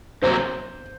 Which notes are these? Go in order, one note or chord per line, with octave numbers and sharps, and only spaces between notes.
C3 F#3 A#3 C5